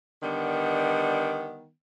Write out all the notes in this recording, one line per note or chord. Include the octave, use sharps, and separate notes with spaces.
D3 D#3 G3 B3